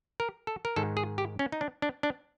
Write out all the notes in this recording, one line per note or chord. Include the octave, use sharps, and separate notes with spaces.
A#4
A4
A#4
G#2 D#3 G#3 A4
G#4
G4
C#4
D#4
D4
D4
D4